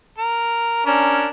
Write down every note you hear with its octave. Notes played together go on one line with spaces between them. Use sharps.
A#4
C#4 D4 A#4